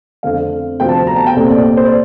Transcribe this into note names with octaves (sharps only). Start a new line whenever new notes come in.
F2 D3 A3 C4 F5
D2 C3 F3 C4 G5
A5
A#5
A5
G5
C2 A#2 A3 C4
D5
D5
C5
D5